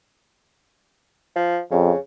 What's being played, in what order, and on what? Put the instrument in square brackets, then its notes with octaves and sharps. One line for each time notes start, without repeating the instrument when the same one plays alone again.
[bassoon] F3
[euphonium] F2 [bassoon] C#3